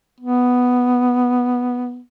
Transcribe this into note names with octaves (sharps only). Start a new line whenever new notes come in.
B3